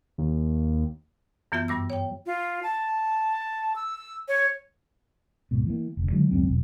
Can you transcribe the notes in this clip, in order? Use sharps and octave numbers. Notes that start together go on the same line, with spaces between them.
D#2
F#2 E3 B3 F4 E5 G6
G2 G3 D6 E6
C#5 G5
F4
A5
E6
C#5
D1 G#2 B2
E3 A#3
F1 D2
D3 D#3 F#3 G#3
D1 C#2 F#2 C4
E1 B1